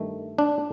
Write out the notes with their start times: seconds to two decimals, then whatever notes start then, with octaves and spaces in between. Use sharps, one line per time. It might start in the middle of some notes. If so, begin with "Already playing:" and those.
Already playing: G2 D#3 A3
0.38 D4